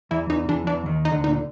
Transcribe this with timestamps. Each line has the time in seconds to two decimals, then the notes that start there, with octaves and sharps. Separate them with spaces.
0.11 E2 E3 E4
0.29 E2 E3 D#4
0.48 E2 E3 D4
0.67 E2 E3 D4
0.86 D#2 D#3
1.05 D#4
1.11 D2 D3
1.24 D#4
1.27 A#2